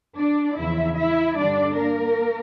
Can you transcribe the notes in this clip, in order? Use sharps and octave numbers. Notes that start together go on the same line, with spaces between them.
D4 D5
E2 C#3 F3 E4 E5
E4 E5
G2 D3 G3 D4 D5
A#3 A#4